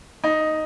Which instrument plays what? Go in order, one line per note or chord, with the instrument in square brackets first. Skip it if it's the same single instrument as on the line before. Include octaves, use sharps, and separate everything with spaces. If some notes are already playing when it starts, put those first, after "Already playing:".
[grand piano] D#4